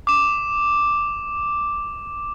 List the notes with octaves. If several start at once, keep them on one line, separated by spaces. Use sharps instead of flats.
D6 E7